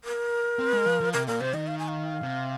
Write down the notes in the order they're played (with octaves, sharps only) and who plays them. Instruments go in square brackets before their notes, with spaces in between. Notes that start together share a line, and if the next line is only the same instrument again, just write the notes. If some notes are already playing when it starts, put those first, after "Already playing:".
[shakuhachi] A#4
[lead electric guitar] C4
G#3
F3
F3
[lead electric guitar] C3 [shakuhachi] A#4
[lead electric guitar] A#2 [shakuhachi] A#4
[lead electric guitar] C3 [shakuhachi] C5
[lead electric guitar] D#3 [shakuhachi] D#5
[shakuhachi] F5
G#5
F5
[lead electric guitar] C3